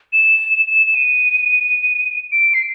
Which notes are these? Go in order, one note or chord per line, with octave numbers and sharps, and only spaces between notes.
E7
E7
E7
D#7
D7
C7